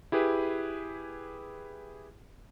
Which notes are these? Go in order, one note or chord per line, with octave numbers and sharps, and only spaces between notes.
E4 G4 G#4 B4